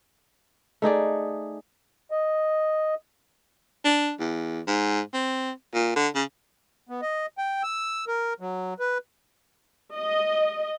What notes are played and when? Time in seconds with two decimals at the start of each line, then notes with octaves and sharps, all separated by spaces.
0.82 A3 D#4 G#4 D5
2.11 D#5
3.84 D4
4.19 E2
4.67 G#2
5.13 C4
5.74 A#2
5.96 D3
6.15 C#3
6.89 B3
7.02 D#5
7.38 G5
7.63 E6
8.07 A#4
8.40 F#3
8.79 B4
9.97 D#5